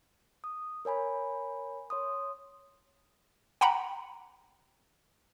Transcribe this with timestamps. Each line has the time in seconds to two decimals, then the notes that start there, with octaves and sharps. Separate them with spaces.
0.44 D#6
0.85 A#4 C#5 G#5 B5
1.90 C#5 C6 D#6
3.61 F#5 G5 A#5 B5